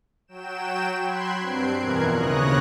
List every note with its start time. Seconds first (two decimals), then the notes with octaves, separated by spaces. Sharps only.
0.28 F#3 G5 E7
1.02 B5 C6 F#6 G#6
1.39 G2 C4 C7 D7
1.76 F2 B2 E3 A#4 F#6 G#6
2.13 D#2 C#3 C#5 D#6 F#6 A#6